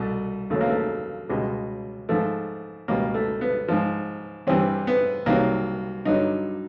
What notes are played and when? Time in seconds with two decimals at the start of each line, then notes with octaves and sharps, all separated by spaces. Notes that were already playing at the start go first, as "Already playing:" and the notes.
Already playing: C2 B2 A3
0.50 D#2 C#3 F#3 A3
0.61 A#3
0.70 A3
1.29 C#2 B2 G3 G#3
2.09 G#2 F3 A3
2.88 C#2 B2 G3 A#3
3.14 A3
3.41 B3
3.68 G#2 F3
4.47 G2 E3 G3 C4
4.87 B3
5.26 C2 C3 D#3 F#3 A#3
6.05 G2 D3 F#3 D#4